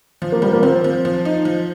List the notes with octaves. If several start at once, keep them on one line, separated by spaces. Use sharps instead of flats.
F3
A#3
F3 G3
A#3
F3 C4
F3
F3
D#4
F3